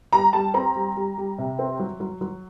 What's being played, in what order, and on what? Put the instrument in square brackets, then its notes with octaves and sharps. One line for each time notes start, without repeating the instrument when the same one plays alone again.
[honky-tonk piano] G3 A#5
G3 A5
C4 A#5
G3
G3
G3
C3
C4
F#3
F#3
F#3